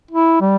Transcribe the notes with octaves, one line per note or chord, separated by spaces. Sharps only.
E4
G3